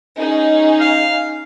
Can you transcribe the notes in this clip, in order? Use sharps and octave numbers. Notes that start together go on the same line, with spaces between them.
C#4 D#4 G#4
F5